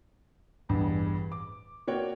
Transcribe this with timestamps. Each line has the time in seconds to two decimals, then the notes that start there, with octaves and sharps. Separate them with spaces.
0.69 A1 E2 G2
1.32 D6
1.88 A#3 F#4 C#5 D5 G5